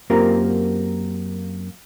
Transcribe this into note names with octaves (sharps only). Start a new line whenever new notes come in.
F#2 A#3 C4 F4 G4 A#4